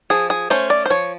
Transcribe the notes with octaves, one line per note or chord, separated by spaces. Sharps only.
F3 G#4
G#4
A3 C#4 C5
D5
C5
F3 C#5